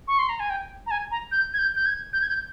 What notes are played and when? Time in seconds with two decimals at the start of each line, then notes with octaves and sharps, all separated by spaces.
0.08 C#6
0.19 C6
0.29 A#5
0.40 G#5
0.50 G5
0.87 A#5
0.91 G#5
1.11 A#5
1.32 G6
1.54 G#6
1.59 G6
1.76 G6
1.86 G#6
2.13 G6
2.22 G#6
2.29 G6